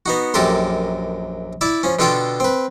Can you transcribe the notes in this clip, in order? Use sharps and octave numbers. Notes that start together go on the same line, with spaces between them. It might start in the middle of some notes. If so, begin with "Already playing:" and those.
B3 D#4 F#4
A#1 F#2 G4 A4 A#4 C6
E4 D5 E5
F3 C#4
B2 D3 F4 A4 G5 C6
C4 B4